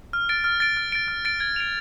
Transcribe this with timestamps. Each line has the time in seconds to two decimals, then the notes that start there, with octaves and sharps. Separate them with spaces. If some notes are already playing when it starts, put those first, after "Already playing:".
0.13 F6
0.29 A6 D7
0.44 F6
0.60 A6 D7
0.77 F6
0.92 A6 D7
1.08 F6
1.25 A6 D7
1.40 G#6
1.56 D7 F7